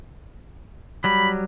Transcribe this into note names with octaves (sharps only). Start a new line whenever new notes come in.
F#3 G3 B5